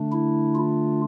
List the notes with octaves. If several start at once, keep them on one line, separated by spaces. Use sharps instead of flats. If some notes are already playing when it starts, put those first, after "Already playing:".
Already playing: D3 A3 D4
E4
F4